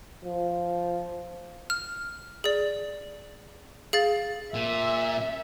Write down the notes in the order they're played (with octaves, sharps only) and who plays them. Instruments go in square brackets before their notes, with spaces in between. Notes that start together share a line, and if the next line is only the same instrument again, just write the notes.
[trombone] F3
[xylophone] F6
G#4 D5
G#4 F5 A6
[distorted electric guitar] A#2 [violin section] E5